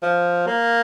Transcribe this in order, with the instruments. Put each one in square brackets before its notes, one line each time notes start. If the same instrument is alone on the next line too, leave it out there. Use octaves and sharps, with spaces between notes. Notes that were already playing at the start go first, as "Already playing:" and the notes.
[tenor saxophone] F3
A#3